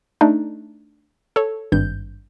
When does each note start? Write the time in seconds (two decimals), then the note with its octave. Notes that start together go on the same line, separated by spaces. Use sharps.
0.21 A3 D4 D#4
1.36 A4 C#5
1.72 G#1 G2 G6